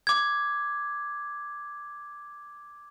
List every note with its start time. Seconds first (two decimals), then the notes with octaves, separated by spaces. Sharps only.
0.07 D6 G#6